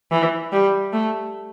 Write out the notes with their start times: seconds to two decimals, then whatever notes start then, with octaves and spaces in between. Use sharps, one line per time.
0.11 E3
0.52 G3
0.93 A3